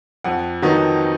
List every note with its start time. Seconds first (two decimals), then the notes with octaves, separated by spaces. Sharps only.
0.24 F2 F#5
0.62 D#3 F#3 B3 D#4